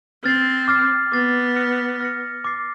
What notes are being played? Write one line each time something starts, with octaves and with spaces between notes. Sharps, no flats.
C4 F6 A6 C7
D6 F6 A6 C7
B3 D6 F6 A6 C7
F6 A#6 C#7
F6 A#6 C#7
D6 F6 A6 C7